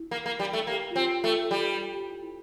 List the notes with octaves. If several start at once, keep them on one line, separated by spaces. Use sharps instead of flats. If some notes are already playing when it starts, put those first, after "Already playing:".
Already playing: E4
A#3
A#3
G3
A3
A#3 G4
F4
C4 G4
A3 F4
G3 A4
G4
G4
E4
E4